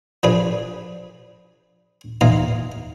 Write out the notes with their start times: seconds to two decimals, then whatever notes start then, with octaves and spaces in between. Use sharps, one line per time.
0.23 F3 D4 G#4 B4
2.21 E3 D#4 F5 A#5 C6